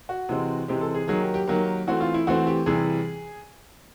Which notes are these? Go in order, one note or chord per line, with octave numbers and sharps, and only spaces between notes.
F#4
C3 E3 G#3 C4
C3 E3 G#3 C4 G4
A4
G#4
D#3 F#3 A#3 G#4
G4
G4
D#3 F#3 A#3
E3 A3 C4 F#4
F4
E4
E3 A3 C4 F#4
G4
C3 E3 G3 G#4